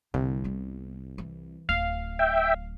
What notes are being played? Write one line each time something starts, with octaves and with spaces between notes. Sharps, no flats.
C2 D3
G3 B3
E3
D1 F5
E5 G5